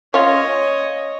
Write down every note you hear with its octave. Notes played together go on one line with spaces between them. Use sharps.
C#4 F4 C#5 D#5